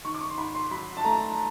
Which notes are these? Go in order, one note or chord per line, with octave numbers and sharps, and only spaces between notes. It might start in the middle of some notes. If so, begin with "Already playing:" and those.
D#3 C#6
D6
C#6
C6
G#2 B5
C6
F#3 B5
A5
A3 A#5